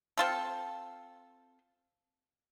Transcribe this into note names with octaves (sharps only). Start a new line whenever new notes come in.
C4 F4 A4